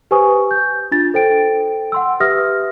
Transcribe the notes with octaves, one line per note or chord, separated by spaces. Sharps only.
G4 B4 C5 G#5 C#6 D#6
G6
D4 F4 A6
A4 C5 G5 D7
F#5 C6 E6
G4 B4 E5 D#6 F6 A#6